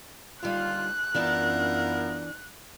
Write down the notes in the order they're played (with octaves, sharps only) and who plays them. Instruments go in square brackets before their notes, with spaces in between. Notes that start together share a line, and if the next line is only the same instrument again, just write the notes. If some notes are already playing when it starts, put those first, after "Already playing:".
[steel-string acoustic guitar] D#2 D3 G3 [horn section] F4 [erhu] F#6
[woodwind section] F#2 B3 [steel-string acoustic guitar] E3 D4 D5 [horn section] E4 F4 A#4